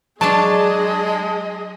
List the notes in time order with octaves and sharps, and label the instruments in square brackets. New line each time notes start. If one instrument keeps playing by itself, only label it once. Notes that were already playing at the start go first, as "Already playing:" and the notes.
[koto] F#3 D4 [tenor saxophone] G#3 [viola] G#4 D#5 [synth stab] A5